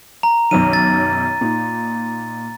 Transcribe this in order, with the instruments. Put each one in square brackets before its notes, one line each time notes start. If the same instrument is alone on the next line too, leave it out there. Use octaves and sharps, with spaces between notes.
[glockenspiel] A#5
[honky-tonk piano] B1 F#2 D#3 [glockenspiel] D#7
[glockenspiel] A6
[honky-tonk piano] A#2 D#4